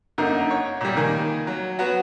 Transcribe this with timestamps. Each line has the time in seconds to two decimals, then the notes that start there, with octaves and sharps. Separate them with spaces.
0.18 F#2 D3 A#3 D#4
0.50 C#5
0.81 A#2 G3
0.97 D#3 A#3 G#5
1.47 F#3
1.79 F#3 B3 F#4